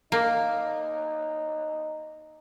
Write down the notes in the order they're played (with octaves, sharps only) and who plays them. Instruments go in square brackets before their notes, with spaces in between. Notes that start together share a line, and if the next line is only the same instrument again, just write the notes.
[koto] A#3 [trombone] D#4